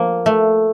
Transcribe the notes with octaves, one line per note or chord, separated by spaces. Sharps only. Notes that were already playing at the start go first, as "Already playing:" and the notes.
Already playing: F3 A#3
A3